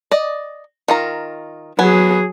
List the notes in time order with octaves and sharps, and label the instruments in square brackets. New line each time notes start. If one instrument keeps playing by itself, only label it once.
[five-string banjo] D5 D#5
D#3 F4 A#5
[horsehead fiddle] F#3 G#4 [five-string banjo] B3 G#5